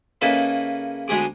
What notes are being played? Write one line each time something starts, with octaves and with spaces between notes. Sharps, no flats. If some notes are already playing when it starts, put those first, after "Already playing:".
C#3 A#3 D#4 E4 A4 B4
D2 G#3 B3 G#4 D6